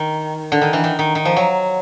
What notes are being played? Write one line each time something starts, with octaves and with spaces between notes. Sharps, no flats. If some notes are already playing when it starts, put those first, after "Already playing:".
Already playing: D#3
D3
D#3
E3
D#3
D#3
D#3
F3
F#3